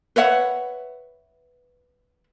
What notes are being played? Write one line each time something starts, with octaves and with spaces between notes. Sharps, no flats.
B4 C#5 E5 F#5